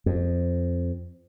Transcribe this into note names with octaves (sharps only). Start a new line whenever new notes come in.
F2